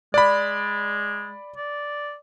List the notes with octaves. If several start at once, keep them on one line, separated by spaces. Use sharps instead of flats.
G#3 D5 B5
D5